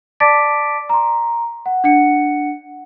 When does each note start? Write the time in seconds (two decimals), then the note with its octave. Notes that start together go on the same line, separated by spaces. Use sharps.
0.20 D5 A5 D6 A6 B6 D7
0.89 A#5 C6
1.66 F#5
1.84 D4 F#5 C#7